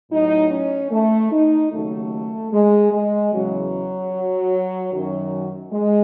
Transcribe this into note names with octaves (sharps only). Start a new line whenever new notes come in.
A2 F#3 D#4
C#4
A3
D#4
D#2 C#3 F#3 A3
G#3
G#3
E2 C#3 E3 F#3
F#2 D#3 F#3
G#3